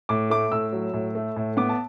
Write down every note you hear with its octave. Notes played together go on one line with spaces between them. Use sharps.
A2 D6
A3 D6
A2 E6
F#3
A2
A3
A2
B3 D6
A5